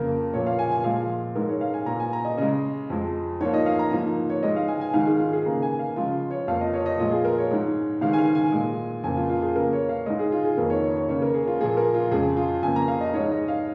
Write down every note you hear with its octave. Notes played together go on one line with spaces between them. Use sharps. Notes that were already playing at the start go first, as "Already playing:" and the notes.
Already playing: F2 C#3 A#3 A#4
A#2 F3 A#3 C#5
F5
G#5
G#5
A#2 F3 G#3 F5
G#2 G#3 A#4
C#5
F5
G#5
A#2 A#3 A#5
G#5
A#5
D#5
C#3 G#3 D#5
F2 F3 G#3
G#2 F3 A#3 C#5
D#5
F5
A#5
G#2 F3 A#3
C#5
G#2 G#3 D#5
F5
G#5
G#5
G#2 D#3 G#3 F5
G#4
F4
G#4
C#3 A#3 A#5
G#5
F5
C#3 F3 G#3 F4
C#5
F2 F3 A#3 F5
D#5
C#5
D#5
A#2 F3 G#3 F4
G#4
A#4
C#5
G#2 G#3
G#2 D#3 G#3 F5
G#5
F5
G#5
A#2 G#3
F2 C#3 A#3 G#5
F4
F4
G#4
C#3 A#3 A#4
C#5
F5
G#2 G#3 D#5
G#4
F4
G#4
F2 D#3 A#3 A#4
C#5
C#5
C#5
C#3 A#3 C#5
A#4
G#4
F4
A#2 F3 A#3 G#4
A#4
F4
F2 C#3 G#3 G#4
F4
F2 C#3 A#3 G#5
A#5
F5
D#5
G#2 G#3 C#5
D#5
F5